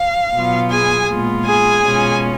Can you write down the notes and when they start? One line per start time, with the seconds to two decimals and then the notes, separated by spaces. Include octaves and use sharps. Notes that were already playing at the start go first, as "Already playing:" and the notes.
Already playing: F5
0.34 B2 F#3 B3 F4
0.71 G#4 G#5
1.08 A#2 G#3 B3 F4
1.45 G#4 G#5
1.82 B2 G#3 C#4 F4